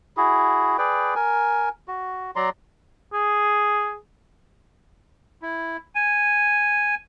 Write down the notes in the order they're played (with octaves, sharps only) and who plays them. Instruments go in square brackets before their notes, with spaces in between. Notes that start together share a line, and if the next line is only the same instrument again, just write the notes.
[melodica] E4 F#4 G#4
G#4 B4 D5 G5
A#4 G#5
F#4
F#3 D5 A#5 C6
[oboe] G#4
[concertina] E4
G#5